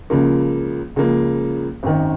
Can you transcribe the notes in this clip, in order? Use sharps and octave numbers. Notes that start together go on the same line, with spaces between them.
C#2 C#3 F3 A#3
C#2 C#3 F3 A#3
G#1 F#2 D#3